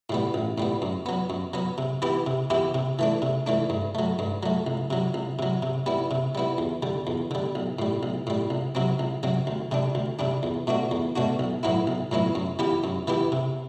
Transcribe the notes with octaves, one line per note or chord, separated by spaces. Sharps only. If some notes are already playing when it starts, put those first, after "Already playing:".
A2 G3 B3
A1
A2 G3 B3
F#2
F#3 B3
F#2
F#3 B3
C3
E3 B3 E4 G4
C3
E3 B3 E4 G4
C3
E3 A3 D4
C3
E3 A3 D4
G2
F#3 A3
G2
F#3 A3
C2
C3 F#3
C2
C3 F#3
C3
G3 B3 E4
C3
G3 B3 E4
E2
D3 G3
E2
D3 G3
B1
A2 G3
B1
A2 G3
C2
C3 F#3 C4
C2
C3 F#3 C4
D2
C3 G3 D4
D2
C3 G3 D4
E2
B2 A3 D4 F#4
E2
B2 A3 D4 F#4
B1
A2 F#3 B3 E4
B1
A2 F#3 B3 E4
F#2
E3 B3 E4 G4
F#2
E3 B3 E4 G4
C3